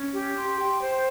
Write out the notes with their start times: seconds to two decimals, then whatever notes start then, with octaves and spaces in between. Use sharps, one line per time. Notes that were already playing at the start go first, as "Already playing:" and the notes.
Already playing: C#4
0.14 G4
0.36 C6
0.58 G5
0.81 C5